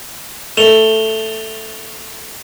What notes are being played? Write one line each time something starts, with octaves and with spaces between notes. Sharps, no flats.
A3 E7 F7 G7